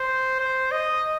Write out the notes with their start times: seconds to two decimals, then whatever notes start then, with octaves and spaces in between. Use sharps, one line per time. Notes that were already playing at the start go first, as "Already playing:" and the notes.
Already playing: C5
0.40 C5
0.72 D#5